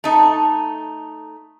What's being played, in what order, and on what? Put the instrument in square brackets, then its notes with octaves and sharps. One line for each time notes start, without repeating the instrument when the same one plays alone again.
[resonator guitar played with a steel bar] A3 D#4